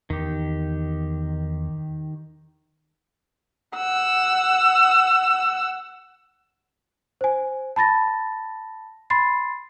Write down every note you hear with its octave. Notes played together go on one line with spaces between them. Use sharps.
E2 D#3 G4
F#5 E6
C5 G#5
A5 B5 A6 A#6
B5 C6 A6 C7